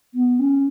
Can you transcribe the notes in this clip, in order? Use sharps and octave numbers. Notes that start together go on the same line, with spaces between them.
B3
C#4